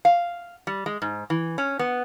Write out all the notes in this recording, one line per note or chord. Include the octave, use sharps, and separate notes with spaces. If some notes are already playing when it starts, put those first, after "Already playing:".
F5
G3
G#3
G#2
E3
C#4
B3